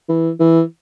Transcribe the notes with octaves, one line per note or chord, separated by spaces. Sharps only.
E3
E3